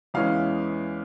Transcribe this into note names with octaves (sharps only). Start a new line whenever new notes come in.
E2 E3 G#3 C#4 F5